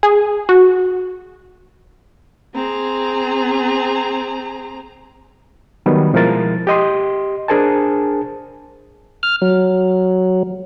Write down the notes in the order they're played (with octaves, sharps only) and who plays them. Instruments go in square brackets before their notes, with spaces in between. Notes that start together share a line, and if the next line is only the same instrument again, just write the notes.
[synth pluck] G#4
F#4
[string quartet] C4 G#4 A#5
[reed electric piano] D#3 F#3 G3 B3
B2 F3 G#3 E4 A#4 A6
G4 D#5 C6
D4 G#4 A#4 C5 G#5 A5
[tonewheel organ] F6
F#3